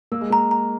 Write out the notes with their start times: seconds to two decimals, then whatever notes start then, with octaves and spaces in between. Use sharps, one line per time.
0.12 A#3 E6
0.21 G#3
0.30 A#3 A#5
0.51 A#5